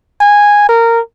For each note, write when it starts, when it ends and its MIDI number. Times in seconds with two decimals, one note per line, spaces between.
0.20 0.67 80
0.69 1.00 70